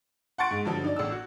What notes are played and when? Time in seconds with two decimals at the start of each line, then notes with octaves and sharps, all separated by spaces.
0.38 F#5 C6 C#6 A6 D7
0.51 G#2
0.65 G2 D3 F3 F#3
0.84 D#4 D5
0.96 A1 D5 E6
1.12 F#4